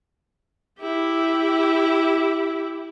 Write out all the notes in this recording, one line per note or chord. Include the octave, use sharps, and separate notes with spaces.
E4 G4